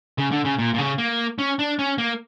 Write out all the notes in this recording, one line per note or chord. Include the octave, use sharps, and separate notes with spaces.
C#3
D3
C#3
A#2
A#2
C#3
A#3
C#4
D4
C#4
A#3